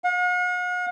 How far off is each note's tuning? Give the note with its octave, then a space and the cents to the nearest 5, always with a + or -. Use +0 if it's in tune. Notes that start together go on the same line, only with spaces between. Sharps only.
F#5 -45